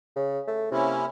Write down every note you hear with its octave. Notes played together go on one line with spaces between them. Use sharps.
C#3
A3
C3 A#3 C#4 E4